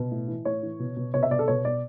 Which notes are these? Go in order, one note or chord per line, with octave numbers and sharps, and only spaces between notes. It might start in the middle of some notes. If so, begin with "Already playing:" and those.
Already playing: B2
A2
E3
A2 C#5
E3
B2
B2
B2 C#5
E5
B2 D5
A4
B2 C#5
B2 D5